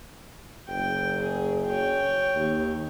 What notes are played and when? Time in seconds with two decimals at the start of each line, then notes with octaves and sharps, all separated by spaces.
0.68 F#1 G5
1.22 G#4
1.67 C#5 G5
2.35 D#2